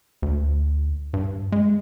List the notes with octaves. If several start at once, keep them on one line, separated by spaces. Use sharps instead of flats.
D2
G2
G#3